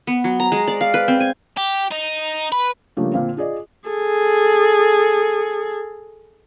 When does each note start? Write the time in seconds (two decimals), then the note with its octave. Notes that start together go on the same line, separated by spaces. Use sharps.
0.07 B3
0.24 F#3
0.40 A#5
0.52 G#3
0.68 D5
0.81 F5
0.94 B4
1.08 C4
1.20 G#5
1.57 G4
1.92 D#4
2.52 B4
2.97 C#3 F3 G3 A3 A#3 D4
3.13 A#2 D3 C4 F5
3.37 F4 G#4 D5 D#5
3.89 G#4 A4